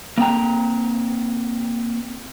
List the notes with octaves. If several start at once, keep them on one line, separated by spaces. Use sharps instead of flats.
A#3 C4 G5 A#5